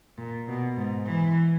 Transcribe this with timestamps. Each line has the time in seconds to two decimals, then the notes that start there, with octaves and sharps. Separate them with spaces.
0.18 A#2
0.48 B2
0.77 G#2
1.07 E3